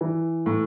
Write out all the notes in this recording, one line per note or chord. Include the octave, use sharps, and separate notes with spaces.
E3
A2